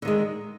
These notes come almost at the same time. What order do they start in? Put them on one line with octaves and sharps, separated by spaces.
D3 D#3 G#3